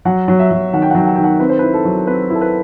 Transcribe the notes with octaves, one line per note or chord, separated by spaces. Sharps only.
F#3 F#5
F#3
E5
F#3
D#3 F#5
G5
F#5
F#3 G5
F#5
D#3 G5
F#5
C4 B4
C5
B4
E4
A4
F#3
C4 B4
E4 A4
B4